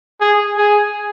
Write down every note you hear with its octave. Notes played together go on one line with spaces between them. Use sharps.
G#4
G#4